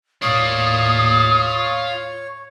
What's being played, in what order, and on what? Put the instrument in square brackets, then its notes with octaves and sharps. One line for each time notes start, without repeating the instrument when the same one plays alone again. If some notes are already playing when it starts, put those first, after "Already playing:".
[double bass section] D#2 A2 [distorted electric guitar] F4 D5 [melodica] C#5 [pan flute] D#6